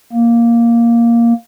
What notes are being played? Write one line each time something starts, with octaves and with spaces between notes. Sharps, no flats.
A#3